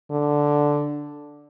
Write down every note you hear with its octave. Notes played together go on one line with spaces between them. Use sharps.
D3